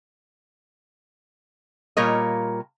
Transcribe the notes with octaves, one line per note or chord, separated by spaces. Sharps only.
A#2 G3 F4 A#4 C#5 D#5